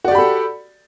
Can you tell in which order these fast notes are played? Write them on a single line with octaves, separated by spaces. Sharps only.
F#4 D5 G4 B5 A4